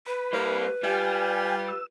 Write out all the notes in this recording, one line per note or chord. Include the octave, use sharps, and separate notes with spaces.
B4 B5
G3 A#3 C5
G3 F4 G5 G#5
E6